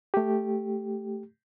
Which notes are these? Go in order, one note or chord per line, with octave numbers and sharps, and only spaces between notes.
A3 G4